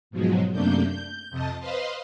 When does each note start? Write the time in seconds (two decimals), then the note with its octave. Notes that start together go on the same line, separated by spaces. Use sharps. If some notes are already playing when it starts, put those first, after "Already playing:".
0.11 G#2 B2 F3 F#3 G#3
0.52 F#2 C3 A3 A#3 D4 G6
0.88 G6
1.30 F2 C3 D#5 A5
1.59 B4 C5 D#5 F5 C6